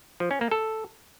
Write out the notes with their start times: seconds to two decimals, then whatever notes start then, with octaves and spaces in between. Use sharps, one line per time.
0.20 F3
0.31 C#4
0.41 A#3
0.51 A4